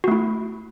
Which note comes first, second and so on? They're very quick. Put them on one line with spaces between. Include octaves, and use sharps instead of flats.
F#4 A3 E4